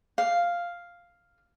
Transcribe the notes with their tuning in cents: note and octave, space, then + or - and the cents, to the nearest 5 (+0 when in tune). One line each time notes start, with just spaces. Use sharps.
F5 +0